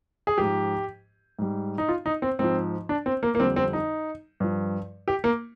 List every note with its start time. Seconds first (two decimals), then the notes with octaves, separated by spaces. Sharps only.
0.27 G#4
0.37 G#2 F3 G4
1.39 G#2 G3
1.78 D#4
1.89 F4
2.06 D#4
2.22 C4
2.39 G#2 F3 C4
2.89 D4
3.06 C4
3.23 A#3
3.35 A#3
3.40 F2 D3 G3 C4
3.56 C4
3.73 D#4
4.40 G2 F3
5.08 G4
5.24 A#3